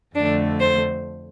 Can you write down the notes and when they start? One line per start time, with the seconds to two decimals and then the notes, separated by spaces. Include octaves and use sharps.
0.16 F2 D3 A3 D4
0.60 C5